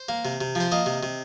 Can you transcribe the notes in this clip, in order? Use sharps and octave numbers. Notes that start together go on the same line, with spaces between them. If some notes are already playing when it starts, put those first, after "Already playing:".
Already playing: C5
A#3
C3
C3
F3 C5
A#3 D#5
C3
C3